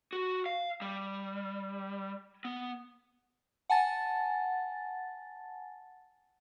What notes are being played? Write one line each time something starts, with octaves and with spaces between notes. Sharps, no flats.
F#4
F5
G3
B3
F#5 G#5 A5 A6